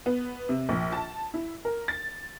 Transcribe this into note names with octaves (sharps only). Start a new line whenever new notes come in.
B3
C3
A#1
A5
E4
A#4
A6